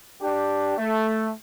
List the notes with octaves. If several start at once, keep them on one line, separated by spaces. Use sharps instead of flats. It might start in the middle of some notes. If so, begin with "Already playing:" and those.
D4 G4
A3